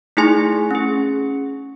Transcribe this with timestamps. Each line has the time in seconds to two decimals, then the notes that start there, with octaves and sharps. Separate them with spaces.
0.17 A3 D#4 E4 G#4 G#5 C6
0.71 C#4 G#4